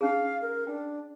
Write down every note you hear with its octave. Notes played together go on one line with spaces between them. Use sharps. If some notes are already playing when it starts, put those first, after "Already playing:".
C#4 D#4 G#4 F5
A#4
D4 G5